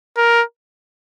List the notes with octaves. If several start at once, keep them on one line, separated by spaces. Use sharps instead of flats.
A#4